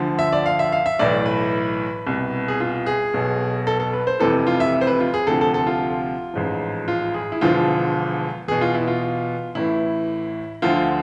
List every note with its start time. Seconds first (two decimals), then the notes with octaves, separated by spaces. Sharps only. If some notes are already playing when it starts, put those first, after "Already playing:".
Already playing: D2 D3 F3
0.19 E5
0.32 D5
0.46 F5
0.59 E5
0.72 F5
0.86 E5
0.99 B1 A2 E3 D5
1.26 B4
2.07 C2 B2
2.48 G#4
2.60 F4
2.86 G#4
3.14 B1 B2
3.67 A4
3.80 A4
3.93 B4
4.07 C5
4.20 F1 F2 C3 E3 A4
4.47 F4
4.60 E5
4.81 C5
4.87 B4
5.00 F4
5.14 G#4
5.27 D2 C3 F3 A4
5.41 A4
5.54 A4
5.67 F4
6.34 A1 G#2 F3
6.88 F4
7.14 G#4
7.32 E4
7.41 E1 E2 D3 F3 F4
8.48 E2 B2 G#4
8.61 F4
8.75 E4
8.87 F4
9.55 A1 A2 E3 E4
10.62 D2 D3 F3 F4